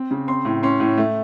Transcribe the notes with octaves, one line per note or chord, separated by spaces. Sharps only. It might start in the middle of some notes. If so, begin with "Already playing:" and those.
Already playing: C4
C#3
C4 C6
A2
C#4 C6
A2
A3